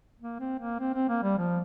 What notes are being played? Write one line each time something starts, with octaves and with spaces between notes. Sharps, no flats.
A#3
C4
A#3
C4
C4
A#3
G3
F3